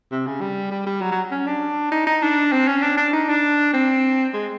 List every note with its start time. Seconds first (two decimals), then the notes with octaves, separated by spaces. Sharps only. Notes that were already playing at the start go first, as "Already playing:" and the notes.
0.11 C3
0.27 C#3
0.41 G3
0.71 G3
0.86 G3
1.02 F#3
1.12 F#3
1.31 C#4
1.47 D4
1.92 D#4
2.07 D#4
2.23 D4
2.52 C4
2.68 C#4
2.82 D4
2.97 D4
3.13 D#4
3.29 D4
3.73 C4
4.34 G#3